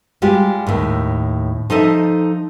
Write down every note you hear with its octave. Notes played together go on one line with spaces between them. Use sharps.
G3 G#3 F4 G4
D#2 A2
F3 D#4 A4 D#5 E5